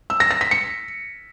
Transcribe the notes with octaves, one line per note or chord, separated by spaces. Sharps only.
E6
A#6
A#6
B6
C#7